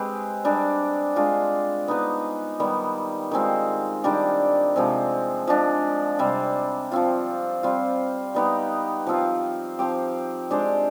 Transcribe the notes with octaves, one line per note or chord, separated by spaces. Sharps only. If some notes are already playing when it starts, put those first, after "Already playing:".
Already playing: G#3 C4 G4 B4
G3 D4 G#4
G#3 D4 F4
B3 D#4 B4
D#3 G3 B3
D#3 G#3 C4 F4
D#3 G3 D4 G4
C3 F3 G#3 C4
F3 G#3 D4
C3 G3 C4
F3 C4 F4
G3 C4 F4
G3 B3 D#4 G4
F3 C4 F4
F3 C4 G4
G#3 D4 G4 C5